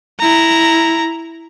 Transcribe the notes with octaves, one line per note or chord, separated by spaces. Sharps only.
E4 A#5